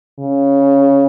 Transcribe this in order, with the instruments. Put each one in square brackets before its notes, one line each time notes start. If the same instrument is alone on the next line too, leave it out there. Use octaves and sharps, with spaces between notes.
[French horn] C#3